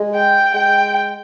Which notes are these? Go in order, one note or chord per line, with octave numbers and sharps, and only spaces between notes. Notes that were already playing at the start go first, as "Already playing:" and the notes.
Already playing: G#3
G5
G#3 G5